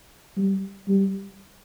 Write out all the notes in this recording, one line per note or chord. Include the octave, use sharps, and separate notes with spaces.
G3
G3